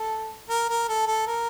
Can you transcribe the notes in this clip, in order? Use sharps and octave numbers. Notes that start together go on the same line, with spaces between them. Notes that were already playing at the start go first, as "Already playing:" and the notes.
Already playing: A4
A#4
A#4
A4
A4
A#4